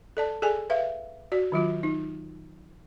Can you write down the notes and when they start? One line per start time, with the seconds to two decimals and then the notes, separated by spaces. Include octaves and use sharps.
0.17 A4 D5 A5
0.42 G#4 A4 D5 G#5
0.70 B4 E5 F5
1.32 F#4 D5
1.52 D#3 F#3 F4
1.83 D#4